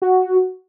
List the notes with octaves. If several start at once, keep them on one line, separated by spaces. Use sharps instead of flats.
F#4